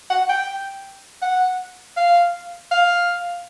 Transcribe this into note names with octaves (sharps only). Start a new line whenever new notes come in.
F#5
G5
F#5
F5
F5